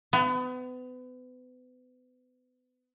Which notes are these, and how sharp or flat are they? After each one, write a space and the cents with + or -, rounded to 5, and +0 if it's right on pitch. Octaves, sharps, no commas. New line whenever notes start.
B3 +35